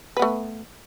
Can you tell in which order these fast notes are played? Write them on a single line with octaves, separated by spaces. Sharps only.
B4 B3 A3